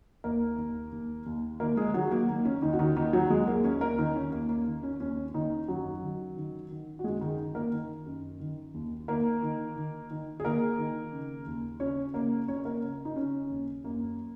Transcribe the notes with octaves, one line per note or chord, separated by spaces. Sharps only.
D#2 A#3 A#4
D#2
D#2
D#2
D#3 A#3 A#4
G#3 G#4
D#3 F#3 F#4
A#3
D#3 A#3
C#4
D#2 D#3 D#4
F#4
D#3 D#4
D#2 D#3 D#4
F#3 F#4
D#2 G#3 G#4
A#3 A#4
D#2 C#4 C#5
A#3 A#4
D#2 D#3 D#4
C#4
D#2 A#3
A#3
D#3
C#4
D#2 C#4
D#2 D#3 D#4
F#2 F#3 F#4
D#3
D#3
D#3
F#4
F#2 G#3 G#4
D#3 D#4
D#3
A#3 A#4
D#3
F#2
D#3
D#2
D#3 A#3 A#4
D#3
D#3
D#3
G#4
D#3 A#3 A#4
D#3
C#3
D#2
C#3 C#4 C#5
C#3 A#3 A#4
C#3 C#4 C#5
A#3 A#4
C#3
D#4
C#3 C#4
D#2
F#2 A#3